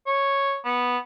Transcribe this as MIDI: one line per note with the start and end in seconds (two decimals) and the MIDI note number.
0.06 0.57 73
0.64 0.98 59